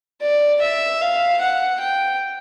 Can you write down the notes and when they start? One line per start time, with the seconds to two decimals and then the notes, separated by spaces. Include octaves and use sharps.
0.22 D5
0.62 E5
1.01 F5
1.41 F#5
1.80 G5